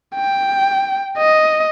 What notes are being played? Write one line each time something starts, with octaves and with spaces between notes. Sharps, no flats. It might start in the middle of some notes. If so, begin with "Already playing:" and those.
G5
D#5